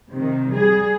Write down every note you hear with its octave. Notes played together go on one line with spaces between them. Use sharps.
C3 D#3
G3 G#4